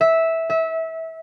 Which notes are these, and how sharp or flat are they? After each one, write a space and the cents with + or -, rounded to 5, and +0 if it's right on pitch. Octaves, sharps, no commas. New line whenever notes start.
E5 -10
E5 -25